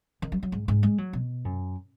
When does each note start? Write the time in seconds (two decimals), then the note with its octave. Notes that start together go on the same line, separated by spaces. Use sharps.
0.22 D#3
0.32 F#3
0.43 F#3
0.52 G#2
0.68 G#2
0.83 G#3
0.98 F#3
1.13 B2
1.45 F#2